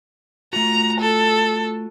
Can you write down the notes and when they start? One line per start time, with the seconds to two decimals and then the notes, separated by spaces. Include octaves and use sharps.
0.53 A3 F4 F#4 A#5
1.00 A4